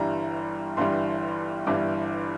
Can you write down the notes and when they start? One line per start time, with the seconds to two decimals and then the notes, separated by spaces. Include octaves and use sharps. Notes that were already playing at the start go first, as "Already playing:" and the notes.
Already playing: G1 G2 E3 G3 A#5
0.77 G1 G2 E3 G3 C6
1.67 G1 G2 E3 G3 D6